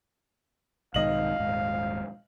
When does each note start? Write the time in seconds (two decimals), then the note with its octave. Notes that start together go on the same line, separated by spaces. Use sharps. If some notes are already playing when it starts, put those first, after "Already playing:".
0.94 B1 G#2 D#3 D#5 F5 F#7
1.39 D#1 G#2